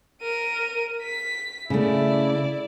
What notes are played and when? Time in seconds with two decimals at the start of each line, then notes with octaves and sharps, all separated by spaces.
0.22 A#4 D#7
1.02 B6
1.70 C#3 A3 E4 D5